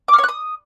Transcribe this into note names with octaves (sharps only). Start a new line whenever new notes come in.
D6
F6
C#5
F#6
D#6